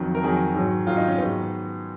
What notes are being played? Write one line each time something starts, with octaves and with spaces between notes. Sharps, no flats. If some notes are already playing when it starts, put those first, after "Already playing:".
Already playing: F2 D#3 F#3
A#4
F2 D#3 F#3 G#4
G#2 D#3 F#3
G#2 D#3 F#3 F4
D#4
C#4
G#2 D#3 F#3 B3